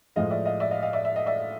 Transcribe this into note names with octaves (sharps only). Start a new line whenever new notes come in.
A2 F3 G#3 D#5 F5
D5 E5
D#5 F5
D5 E5
D#5 F5
D#5 F5
D5 E5
E5
D#5
D5 E5